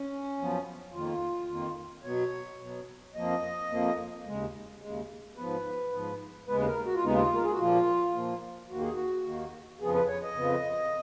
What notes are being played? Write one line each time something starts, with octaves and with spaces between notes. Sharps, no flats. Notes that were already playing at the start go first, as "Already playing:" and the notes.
Already playing: C#4
F#2 F3 B3
F2 D#3 A#3 F4
F2 D#3 A#3
B2 F#3 B3 C#5
B2 F#3 B3
F2 F3 A#3 D#5
F2 F3 A#3
D#2 C#3 G#3
D#2 C#3 G#3
G#2 F3 B3 B4
G#2 F3 B3
D#2 C#3 G#3 B3 B4
B4
A#4
F#4
F4
D#2 C#3 G#3 B3 D#4
F4
A#4
G#4
F#4
A#2 F3 A#3 F4
A#2 F3 A#3
D#2 D#3 A#3 F#4
G#4
F#4
D#2 D#3 A#3
F2 C#3 F3 B3 G#4
B4
C#5
D#5
F2 C#3 F3 B3